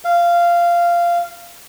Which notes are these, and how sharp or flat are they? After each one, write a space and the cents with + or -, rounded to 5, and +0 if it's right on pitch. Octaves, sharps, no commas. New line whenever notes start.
F5 -15